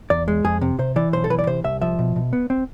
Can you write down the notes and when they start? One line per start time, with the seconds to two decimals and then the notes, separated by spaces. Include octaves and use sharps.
0.10 E2 D5
0.28 G#3
0.44 F2 G#4
0.61 C3
0.79 C3 C5
0.96 E3 D5
1.13 B1 C5
1.24 A4
1.30 E3 B4
1.39 D5
1.47 C3 C5
1.64 C2 E5
1.81 F3 E5
1.99 B2
2.16 B2
2.33 B3
2.50 C4